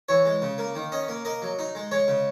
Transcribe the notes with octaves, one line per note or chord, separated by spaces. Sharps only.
E3 C#5
G#3
C#3
A#3
D#3
C#4 D#5
A#3
A#3 D#5
F#3
D#4
G#3
G#3 C#5
C#3